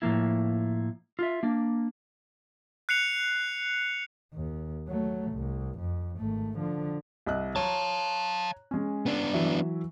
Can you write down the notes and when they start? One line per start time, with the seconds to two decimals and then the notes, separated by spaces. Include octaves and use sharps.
0.02 A2 F3 A#3 E4
1.19 F4 E5
1.43 A#3 D4
2.89 F#6 C7 C#7 F7
4.34 D#2
4.88 F#3 A3
5.32 C2
5.79 F2
6.18 G#1 A3
6.58 D3 F3
7.26 C2 D#5 F#6
7.56 C#5 F5 A5 A#5
8.71 G#3 C#4
9.06 B3 D4
9.34 E3 F#3 E5